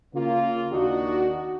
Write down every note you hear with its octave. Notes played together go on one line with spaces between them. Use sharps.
C#3 A#3 C#4 F4
D#2 D4 D#4 F#4